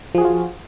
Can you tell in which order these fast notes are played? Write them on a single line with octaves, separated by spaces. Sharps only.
F3 G#4 F#4 F4